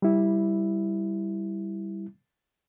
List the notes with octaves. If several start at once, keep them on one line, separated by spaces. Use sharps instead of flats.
G3 E4